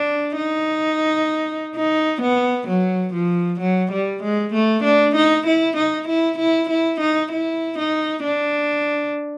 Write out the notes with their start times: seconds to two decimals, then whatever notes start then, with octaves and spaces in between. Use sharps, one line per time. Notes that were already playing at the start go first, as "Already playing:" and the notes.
Already playing: D4
0.37 D#4
1.75 D#4
2.22 B3
2.68 F#3
3.14 F3
3.60 F#3
3.92 G3
4.23 G#3
4.54 A3
4.84 D4
5.16 D#4
5.47 E4
5.77 D#4
6.08 E4
6.38 E4
6.70 E4
7.01 D#4
7.32 E4
7.78 D#4
8.24 D4